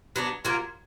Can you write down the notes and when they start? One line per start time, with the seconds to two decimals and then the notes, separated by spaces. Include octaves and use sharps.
0.16 F#3 B3 D4
0.45 F#3 A#3 F4